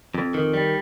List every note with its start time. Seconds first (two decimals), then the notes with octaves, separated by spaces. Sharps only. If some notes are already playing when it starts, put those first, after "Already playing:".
0.14 F2
0.34 D#3
0.53 G3